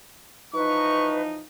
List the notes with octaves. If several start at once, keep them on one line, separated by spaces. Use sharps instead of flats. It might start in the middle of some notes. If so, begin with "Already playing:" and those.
E3 F3 D#4 B4 C#6